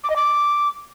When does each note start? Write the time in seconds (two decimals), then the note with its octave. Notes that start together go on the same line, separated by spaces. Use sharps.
0.04 D6
0.10 D#5
0.16 D6